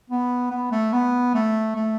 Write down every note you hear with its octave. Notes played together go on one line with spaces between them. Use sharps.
B3
B3
A3
B3
A3
A3